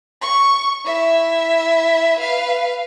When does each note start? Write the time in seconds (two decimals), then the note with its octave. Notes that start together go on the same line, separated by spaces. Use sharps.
0.22 C#6
0.85 E4 E5
2.19 B4 F5